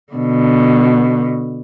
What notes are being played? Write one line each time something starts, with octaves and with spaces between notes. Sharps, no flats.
B2 D3